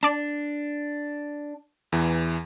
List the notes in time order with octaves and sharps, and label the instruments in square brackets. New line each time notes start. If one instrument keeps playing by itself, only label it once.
[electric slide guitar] D4 [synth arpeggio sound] D5 A5
[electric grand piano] E2 E3